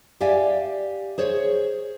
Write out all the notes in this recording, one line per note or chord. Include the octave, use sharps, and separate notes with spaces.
G4 D5 E5 F5 G#5
G#4 C5 C#5